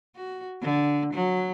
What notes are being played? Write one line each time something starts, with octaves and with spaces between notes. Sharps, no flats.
F#4
D3
F#3